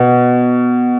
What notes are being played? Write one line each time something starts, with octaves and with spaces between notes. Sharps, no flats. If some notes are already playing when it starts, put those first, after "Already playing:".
Already playing: B2